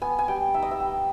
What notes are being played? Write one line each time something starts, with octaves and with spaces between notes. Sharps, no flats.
B3 G#5
G#5
G3 G5
D#4 E5
D#5
E5
G3 G5